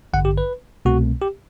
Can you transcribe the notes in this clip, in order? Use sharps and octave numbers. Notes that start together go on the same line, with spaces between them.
A1 G2 D3 F#5
G4
B4
C2 B2 A3 C4 F#4
G4